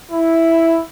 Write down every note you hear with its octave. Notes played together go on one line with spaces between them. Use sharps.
E4